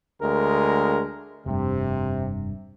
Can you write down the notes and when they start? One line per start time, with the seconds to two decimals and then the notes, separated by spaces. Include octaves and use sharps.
0.22 D2 G#3 A#4
1.46 F1 G2 C3